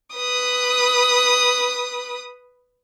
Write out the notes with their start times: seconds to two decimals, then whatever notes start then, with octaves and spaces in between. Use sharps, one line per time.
0.16 B4 D#6